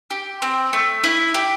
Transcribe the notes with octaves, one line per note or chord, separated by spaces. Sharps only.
G4
C4
A3
E4
G4